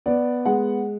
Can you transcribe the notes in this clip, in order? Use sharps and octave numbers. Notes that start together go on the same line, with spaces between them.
B3 D5
G#3 F#5